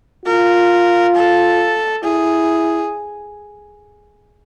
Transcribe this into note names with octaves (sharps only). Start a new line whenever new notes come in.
F4 A#4
A4
E4 G#4